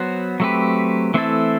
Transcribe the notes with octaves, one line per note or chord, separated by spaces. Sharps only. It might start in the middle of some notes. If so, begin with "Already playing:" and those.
Already playing: F#3 B3 F#4 C5
F#3 A3 C4 G4 B4
E3 A3 C4 E4 A4